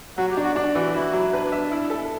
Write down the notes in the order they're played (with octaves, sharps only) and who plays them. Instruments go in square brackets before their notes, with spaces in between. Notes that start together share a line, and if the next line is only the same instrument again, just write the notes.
[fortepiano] F#3 [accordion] F#4
[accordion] G4
[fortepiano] D4
[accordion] F#4
[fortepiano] D4
[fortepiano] E3 [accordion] F#4
[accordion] E4 [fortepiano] F#4
[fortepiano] F#3
[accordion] D4 [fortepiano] B4
[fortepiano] E5
E4
A4